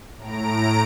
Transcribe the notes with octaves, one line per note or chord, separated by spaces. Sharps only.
A2 A#5 D7